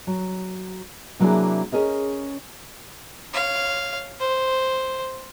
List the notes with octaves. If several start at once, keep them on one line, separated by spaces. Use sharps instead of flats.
F#3
C3 F#3 A#3 D4 E4 G#4
C#4 G#4 A#4 D#5
C#5 F5
C5